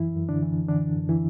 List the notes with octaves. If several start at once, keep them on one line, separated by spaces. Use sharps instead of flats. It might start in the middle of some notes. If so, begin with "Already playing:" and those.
Already playing: F#2 E3 E4
F#2
D3 D4
E3
D3 E3 D4
F#2
E3 E4